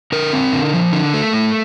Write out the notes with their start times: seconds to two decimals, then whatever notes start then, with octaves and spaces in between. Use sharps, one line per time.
0.12 D3 A#4
0.33 C4
0.53 D3
0.73 F3
0.93 D3
1.14 A3
1.33 A2